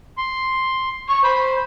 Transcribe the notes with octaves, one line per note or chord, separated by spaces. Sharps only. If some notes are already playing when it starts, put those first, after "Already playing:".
C6
C#6
C5 B5